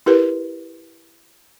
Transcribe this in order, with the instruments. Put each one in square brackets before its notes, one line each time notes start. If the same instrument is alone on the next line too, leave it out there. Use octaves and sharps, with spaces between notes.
[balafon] E4 G4 A#4 B4